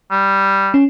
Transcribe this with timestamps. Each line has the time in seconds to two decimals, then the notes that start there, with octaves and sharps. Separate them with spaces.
0.11 G3
0.74 C#4